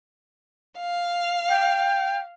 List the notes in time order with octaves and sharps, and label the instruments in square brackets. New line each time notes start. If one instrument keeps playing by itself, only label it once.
[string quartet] F5
[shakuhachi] G5